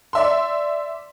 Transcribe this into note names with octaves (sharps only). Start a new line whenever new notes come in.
D5 E5 C6